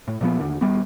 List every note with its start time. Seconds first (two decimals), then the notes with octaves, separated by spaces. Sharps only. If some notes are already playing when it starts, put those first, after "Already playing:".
0.08 A2
0.21 A#2 F3 B3
0.39 D#2 D3
0.61 D#1 C2 G3 B3